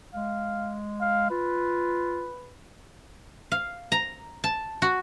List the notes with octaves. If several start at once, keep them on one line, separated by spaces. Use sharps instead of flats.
G#3 F5
F5
F4 B4
F5
A#5
A5
F#4